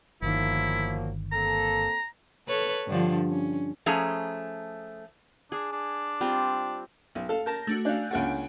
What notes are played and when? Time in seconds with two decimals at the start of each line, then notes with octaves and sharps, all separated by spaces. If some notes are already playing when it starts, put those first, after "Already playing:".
0.22 G1 D#3 F3 F#3 A#3 E4
1.32 A#3 C4 A4 A#5
2.47 A4 B4 C#5
2.87 G2 D3 F3
3.30 C#4
3.86 F3 A3 C#4 G#4 A#5
5.52 D4 G#4
5.72 D4
6.21 G3 C4 F4
7.15 B1
7.29 A4 F5
7.46 A#4 A5 G6 A#6
7.67 A3 D4 F#4
7.85 D4 F5 G#5 F#6 G6
8.11 C#2 A#3 D4 C#5 F#5 D7